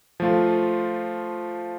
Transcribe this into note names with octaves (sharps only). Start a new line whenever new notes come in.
F3 A3 F4